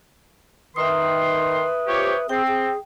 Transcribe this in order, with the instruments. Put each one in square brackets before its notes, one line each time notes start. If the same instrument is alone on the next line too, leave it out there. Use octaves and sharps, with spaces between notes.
[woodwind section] D#3 C6 [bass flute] B4 [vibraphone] E5 D#6
[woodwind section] F3 G4 C#5
[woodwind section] C4 [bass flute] G#4 [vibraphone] G5
[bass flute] G#4